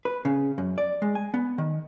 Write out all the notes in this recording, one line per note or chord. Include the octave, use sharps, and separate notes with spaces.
B4
C#3
F#2
D5
G#3
G#5
B3
D#3